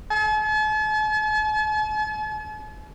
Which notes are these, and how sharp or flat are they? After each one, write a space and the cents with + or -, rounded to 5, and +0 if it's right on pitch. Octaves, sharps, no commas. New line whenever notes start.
A5 -45